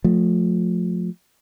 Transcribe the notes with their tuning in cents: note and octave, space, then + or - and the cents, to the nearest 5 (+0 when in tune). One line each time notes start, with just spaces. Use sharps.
F3 +30 A3 +0